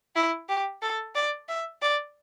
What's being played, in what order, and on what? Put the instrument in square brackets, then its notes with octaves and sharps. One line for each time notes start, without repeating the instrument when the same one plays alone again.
[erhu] E4
G4
A4
D5
E5
D5